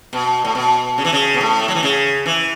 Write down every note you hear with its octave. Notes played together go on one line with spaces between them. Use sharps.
B2
A2
B2
C#3
E3
C#3
B2
A2
A3
F#3
E3
C#3
E3